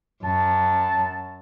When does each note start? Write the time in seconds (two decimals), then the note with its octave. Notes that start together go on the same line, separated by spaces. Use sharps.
0.24 F#2 A5